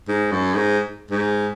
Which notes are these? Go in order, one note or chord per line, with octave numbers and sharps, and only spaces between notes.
G#2
F#2
G#2
G#2